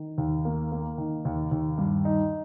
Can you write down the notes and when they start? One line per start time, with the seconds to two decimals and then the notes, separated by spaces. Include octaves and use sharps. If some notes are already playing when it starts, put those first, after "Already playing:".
Already playing: D#3
0.18 D#2
0.45 A#3
0.72 A#3
0.98 D#3
1.25 D#2
1.51 D#2
1.78 G2
2.05 D#4